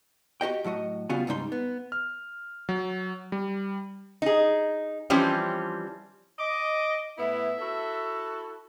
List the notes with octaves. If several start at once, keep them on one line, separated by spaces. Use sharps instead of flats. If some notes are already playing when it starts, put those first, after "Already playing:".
F#4 G4 D#5 G5
A2 F#3 F#4 D#5
C#3 G3 B3 F4 F#4 G#5
C#2 G#2 G3 D#4 C6
B3
F6
F#3
G3
D#4 G#4
E3 F3 G3 C4 C#4
D#5 D6
A2 B3 E4 E5
E4 F#4 A4